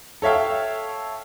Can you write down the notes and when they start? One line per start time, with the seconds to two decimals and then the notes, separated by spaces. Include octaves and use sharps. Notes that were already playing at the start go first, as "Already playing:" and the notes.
0.22 A4 C#5 E5 F5 G5